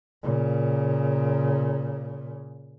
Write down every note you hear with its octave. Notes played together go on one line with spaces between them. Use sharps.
A#2 C#3